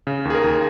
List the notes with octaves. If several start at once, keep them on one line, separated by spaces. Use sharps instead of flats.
C#3
D#2 G#4
A#4
D#2